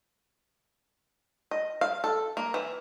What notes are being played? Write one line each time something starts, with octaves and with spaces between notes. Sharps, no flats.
D#5
F5
A4
A#3
E3